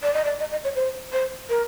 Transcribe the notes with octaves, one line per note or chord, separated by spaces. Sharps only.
D5
D#5
D5
D#5
D#5
C#5
C5
C5
A#4